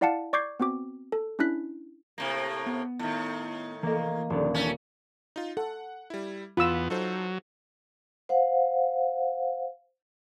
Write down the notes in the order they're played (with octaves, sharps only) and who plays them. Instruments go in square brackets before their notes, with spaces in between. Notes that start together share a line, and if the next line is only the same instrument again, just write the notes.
[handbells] E4 D5 F5 F#5 A5 C#7
D5 C#6 D6 G6 G#6 C7
B3 C4 F#4 D6
A4
C#4 D4 E4 F#6 B6
[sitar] A2 C3 A#3
[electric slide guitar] B3
[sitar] A2 D#3
[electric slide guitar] E3 D#5 [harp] A#3
[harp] D#1 [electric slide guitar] D3 D#3 F3
[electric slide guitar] E3 D4 [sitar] A3 C#4
[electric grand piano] D#4 F4
[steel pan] A4 [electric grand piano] F#5
[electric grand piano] G3 E4
[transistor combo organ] E2 B3 [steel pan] F4 E6 [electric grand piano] B5
[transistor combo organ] F#3 [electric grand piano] D#4 A4 C5
[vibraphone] C5 F5 F#5